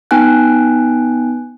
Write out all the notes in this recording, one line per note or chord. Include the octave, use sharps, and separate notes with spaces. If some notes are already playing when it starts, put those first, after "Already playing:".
B3 D#4 G5 G#5 F#6